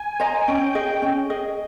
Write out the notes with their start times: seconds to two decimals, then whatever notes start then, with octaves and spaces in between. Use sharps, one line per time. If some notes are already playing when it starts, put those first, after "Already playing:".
Already playing: G#5
0.20 C5 D#5 A#5
0.47 C#4 G5
0.75 G#4 D#5
1.02 C#4
1.30 G#4 D#5